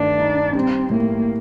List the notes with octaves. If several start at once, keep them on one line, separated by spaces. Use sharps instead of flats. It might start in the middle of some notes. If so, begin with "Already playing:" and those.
Already playing: G2 D#3 A3 D4
D#4
G3 C4
A2 A#3